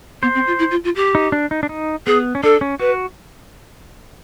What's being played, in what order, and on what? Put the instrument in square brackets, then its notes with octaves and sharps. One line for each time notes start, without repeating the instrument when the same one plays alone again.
[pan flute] B3 [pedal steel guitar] C5
[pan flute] C4
F4
E4
F4
F4
G4
[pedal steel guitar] D#4
D4
D#4
D4
D#4
[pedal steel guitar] B3 [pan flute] G#4
[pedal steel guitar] C#4
[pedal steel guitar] D4 [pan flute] A4
[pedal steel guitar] C#4
[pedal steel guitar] F#4 [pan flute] B4